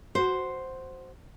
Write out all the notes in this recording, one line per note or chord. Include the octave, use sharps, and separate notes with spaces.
F#4 C5